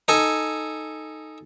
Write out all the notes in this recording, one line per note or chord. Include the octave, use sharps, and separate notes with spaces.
D#4 A4 G#5